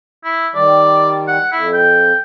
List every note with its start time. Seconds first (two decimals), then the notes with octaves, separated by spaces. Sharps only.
0.24 E4
0.55 D#3 G3 D5
1.28 F#5
1.52 F2 E4
1.73 G5